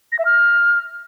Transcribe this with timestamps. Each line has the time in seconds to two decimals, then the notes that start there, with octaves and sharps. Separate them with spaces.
0.12 A#6
0.19 E5
0.25 F6